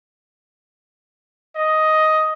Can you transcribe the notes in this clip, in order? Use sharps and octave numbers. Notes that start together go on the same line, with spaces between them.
D#5